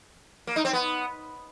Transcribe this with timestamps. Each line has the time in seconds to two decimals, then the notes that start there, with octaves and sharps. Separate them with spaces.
0.47 A#3
0.56 D#4
0.65 C4
0.73 B3